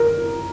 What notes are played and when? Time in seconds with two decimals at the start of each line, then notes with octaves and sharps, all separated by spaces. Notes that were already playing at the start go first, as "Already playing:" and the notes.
Already playing: A#4